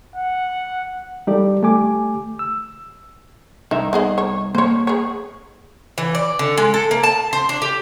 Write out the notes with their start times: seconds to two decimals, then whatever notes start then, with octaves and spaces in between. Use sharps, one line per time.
0.16 F#5
1.27 G3 D#4 G4 A4 D5
1.63 A3 G4 G#5 D6
2.39 E6
3.71 C2 D#3 D#4 E5
3.93 B3 G#4 D#5
4.18 C#5
4.55 A#3 C5 C#5
4.87 G#4 C#5
5.98 E3
6.15 D5
6.39 D3
6.58 G#3
6.74 A4
6.91 A#3
7.03 A5
7.33 C5
7.49 D4
7.62 G4